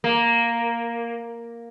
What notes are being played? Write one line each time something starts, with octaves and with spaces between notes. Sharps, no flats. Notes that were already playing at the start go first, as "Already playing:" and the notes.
A#3